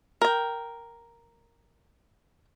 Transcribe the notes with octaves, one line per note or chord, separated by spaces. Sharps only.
A#4 G5